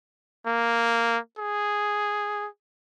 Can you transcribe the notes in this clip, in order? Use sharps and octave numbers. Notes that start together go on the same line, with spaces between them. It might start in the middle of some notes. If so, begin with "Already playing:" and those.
A#3
G#4